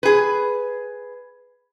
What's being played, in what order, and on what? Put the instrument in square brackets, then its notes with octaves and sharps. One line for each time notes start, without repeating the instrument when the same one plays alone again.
[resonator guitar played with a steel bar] G#4 B4